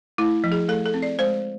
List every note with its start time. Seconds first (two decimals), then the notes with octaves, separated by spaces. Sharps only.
0.18 A3 E4
0.44 F3
0.52 G#4
0.69 A3 A4
0.86 A4
0.94 C4
1.02 D5
1.19 G#3 C5